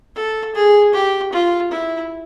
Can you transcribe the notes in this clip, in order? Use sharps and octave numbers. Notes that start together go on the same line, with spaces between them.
A4
G#4
G4
F4
E4